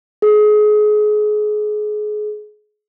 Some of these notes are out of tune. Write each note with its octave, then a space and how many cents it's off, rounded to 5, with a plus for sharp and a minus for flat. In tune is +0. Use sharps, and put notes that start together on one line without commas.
G#4 +30